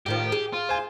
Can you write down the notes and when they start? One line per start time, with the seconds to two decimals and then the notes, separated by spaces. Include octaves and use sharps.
0.06 A2 D#3 F3 G4
0.32 G#4
0.53 F4
0.69 C5 G#5